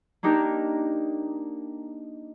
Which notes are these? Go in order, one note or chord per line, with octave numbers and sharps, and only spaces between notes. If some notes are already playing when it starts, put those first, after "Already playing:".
A#3 D4 D#4 G4 A#4